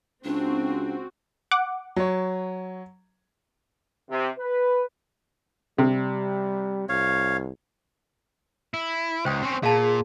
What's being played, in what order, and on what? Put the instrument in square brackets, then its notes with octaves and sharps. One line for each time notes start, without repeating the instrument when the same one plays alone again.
[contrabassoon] C#2 [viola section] C4 F#4 [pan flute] D4
[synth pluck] F#5 D6
[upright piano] F#3 C#5
[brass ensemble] C3
B4
[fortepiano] C3 [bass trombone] G3
[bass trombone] C2 [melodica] C#5 F5
[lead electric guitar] E4
[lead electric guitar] C#2 [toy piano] C5 G5 D#6
[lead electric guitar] C4 C#4
[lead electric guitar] A#2 [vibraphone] G#4 [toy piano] F5 A5